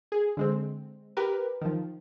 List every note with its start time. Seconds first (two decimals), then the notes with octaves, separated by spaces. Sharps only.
0.12 G#4
0.37 D3 G#3 C4
1.17 G4 A#4 B4
1.61 D#3 F3